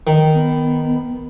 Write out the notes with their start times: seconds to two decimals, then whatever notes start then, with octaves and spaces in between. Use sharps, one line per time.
0.07 D#3
0.34 B3